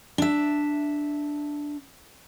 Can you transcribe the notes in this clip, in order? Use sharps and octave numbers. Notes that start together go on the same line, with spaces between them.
D4 E5